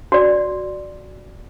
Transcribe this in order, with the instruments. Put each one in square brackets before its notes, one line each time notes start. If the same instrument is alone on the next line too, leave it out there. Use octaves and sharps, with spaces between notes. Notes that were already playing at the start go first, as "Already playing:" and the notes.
[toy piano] F#4 D5